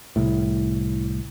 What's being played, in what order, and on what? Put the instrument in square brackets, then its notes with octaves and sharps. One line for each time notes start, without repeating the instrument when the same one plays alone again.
[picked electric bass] C2 A2